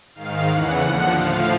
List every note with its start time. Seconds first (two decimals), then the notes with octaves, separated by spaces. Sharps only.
0.14 G#2 D#3 F5
0.48 E2 C#3 E3 F#5
0.81 D#2 D3 F3 F#5
1.14 A2 F3 F5